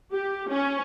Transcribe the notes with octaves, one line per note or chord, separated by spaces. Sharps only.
G4
C#4